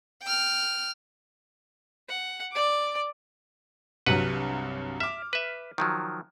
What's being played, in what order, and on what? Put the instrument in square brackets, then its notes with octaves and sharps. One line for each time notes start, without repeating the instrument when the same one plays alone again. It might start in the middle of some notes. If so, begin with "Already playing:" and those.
[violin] G5 F6
[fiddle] F#5
D5 D6
[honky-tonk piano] C2 G2 F#3 [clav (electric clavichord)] B4 F#5
[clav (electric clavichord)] E5 [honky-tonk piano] D6 F6
[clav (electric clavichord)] B4 E5
D#3 F3 F#3